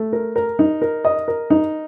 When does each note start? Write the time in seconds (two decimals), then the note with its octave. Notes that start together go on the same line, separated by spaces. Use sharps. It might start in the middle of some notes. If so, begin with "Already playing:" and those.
Already playing: A3
0.13 A#4
0.36 A#4
0.59 D#4
0.82 A#4
1.05 D#5
1.28 A#4
1.50 D#4